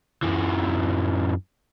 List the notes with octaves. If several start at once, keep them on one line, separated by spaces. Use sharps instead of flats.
F#2 E3